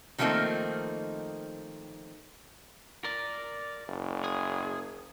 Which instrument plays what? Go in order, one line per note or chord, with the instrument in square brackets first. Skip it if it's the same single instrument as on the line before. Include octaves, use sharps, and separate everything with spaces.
[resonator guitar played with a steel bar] D#3 F3 A3 A#3 C4 D#4
[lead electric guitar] A#4 D5
[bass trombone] F#1
[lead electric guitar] G#4